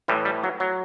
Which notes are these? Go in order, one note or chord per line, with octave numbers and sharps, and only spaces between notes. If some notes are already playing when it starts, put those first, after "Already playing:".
A2 E3 G3
G3
F#3
F#3